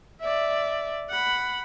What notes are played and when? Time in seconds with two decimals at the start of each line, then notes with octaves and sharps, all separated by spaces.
0.21 D5 E5
1.10 F#5 B5